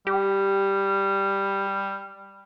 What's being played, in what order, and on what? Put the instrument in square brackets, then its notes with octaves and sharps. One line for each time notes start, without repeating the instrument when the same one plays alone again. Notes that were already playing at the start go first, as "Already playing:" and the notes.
[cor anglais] G3 [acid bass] G4